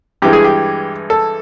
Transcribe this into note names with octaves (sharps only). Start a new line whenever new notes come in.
G2 E3 G#3 G4
G#4
G4
A4